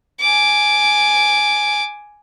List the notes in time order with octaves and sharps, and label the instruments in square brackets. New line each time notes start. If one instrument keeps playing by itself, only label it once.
[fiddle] G#5 D6